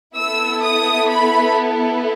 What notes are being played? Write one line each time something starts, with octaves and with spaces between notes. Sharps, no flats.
B3 E4 A4 E6
D#6
B5